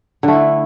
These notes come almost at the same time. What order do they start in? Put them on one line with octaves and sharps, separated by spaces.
D3 A3 E4